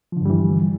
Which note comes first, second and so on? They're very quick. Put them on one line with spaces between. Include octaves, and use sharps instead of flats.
F3 D3 G2 G3 E3